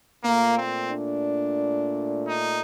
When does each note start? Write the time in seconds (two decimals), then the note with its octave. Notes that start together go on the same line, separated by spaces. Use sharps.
0.23 A#2 A3 A#3
0.57 C4
0.91 D4
2.26 D#4